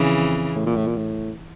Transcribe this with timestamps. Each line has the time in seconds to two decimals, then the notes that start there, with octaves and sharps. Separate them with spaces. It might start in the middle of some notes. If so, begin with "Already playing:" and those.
Already playing: F2 C#3 E3
0.56 A2
0.66 A#2
0.76 A2
0.87 A#2
0.97 A2